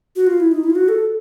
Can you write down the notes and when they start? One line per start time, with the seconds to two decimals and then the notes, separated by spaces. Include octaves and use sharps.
0.16 F#4
0.27 F4
0.40 E4
0.52 D#4
0.64 E4
0.70 F4
0.75 F#4
0.89 A4